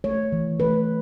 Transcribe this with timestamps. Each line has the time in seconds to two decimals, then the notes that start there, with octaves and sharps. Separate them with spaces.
0.04 A3 C#5
0.32 E3
0.60 A3 B4